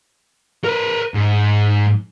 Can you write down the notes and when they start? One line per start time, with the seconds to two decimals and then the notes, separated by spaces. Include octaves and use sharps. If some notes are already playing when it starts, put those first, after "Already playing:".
0.64 A#4 B4
1.14 G#2